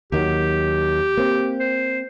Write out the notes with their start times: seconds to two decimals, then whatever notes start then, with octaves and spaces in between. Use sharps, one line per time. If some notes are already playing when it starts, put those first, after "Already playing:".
0.12 D#2 D#3 F#3 G4
1.17 A#3 C4
1.60 C5